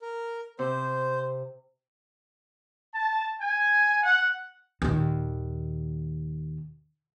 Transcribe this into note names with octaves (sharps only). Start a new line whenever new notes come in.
A#4
C3 C5
A5
G#5
F#5
D#2 A#2